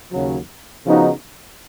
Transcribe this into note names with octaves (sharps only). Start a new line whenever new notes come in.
D#2 C#3 F#3
C#3 F3 B3 D#4 F#4